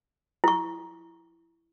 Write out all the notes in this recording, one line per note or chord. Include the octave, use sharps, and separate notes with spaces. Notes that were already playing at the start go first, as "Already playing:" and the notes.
E4 C#6